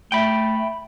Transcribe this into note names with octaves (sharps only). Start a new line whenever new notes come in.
A3 G5 B5